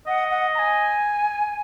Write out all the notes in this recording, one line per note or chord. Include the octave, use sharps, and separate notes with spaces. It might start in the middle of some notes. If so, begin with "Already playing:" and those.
D#5 F#5
F#5
A#5
G#5